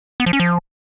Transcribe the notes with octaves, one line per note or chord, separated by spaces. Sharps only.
B3
F3
C#4
F3